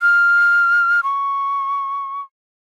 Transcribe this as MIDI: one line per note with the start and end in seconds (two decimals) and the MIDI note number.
0.02 1.01 89
1.03 2.22 85